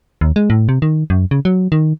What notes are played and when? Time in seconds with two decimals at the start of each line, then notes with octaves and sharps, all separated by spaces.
0.21 D#2
0.36 G#3
0.50 A2
0.69 C3
0.82 D#3
1.10 F#2
1.31 C#3
1.45 F#3
1.72 D#3